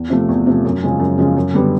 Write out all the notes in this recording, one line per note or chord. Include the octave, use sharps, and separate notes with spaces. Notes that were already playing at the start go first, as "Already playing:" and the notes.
Already playing: E2
C3 F3 A3
E2
C3 F3 A3
F#2
C#3 F3 G#3 C#4
F#2
C#3 F3 G#3 C#4
F#2
D3 G3 B3